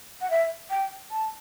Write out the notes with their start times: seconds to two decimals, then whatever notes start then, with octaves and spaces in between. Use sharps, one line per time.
0.21 F#5
0.30 E5
0.70 G5
1.11 A5